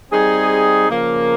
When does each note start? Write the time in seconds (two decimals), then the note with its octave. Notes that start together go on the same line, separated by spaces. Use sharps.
0.12 G3 C4 D#4 G#4
0.89 C#3 F3 A#3